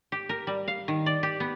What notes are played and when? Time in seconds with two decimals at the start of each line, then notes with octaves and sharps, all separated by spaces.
0.12 G4
0.29 A#4
0.47 G3
0.68 F5
0.88 D#3
1.06 D5
1.23 G4
1.40 B3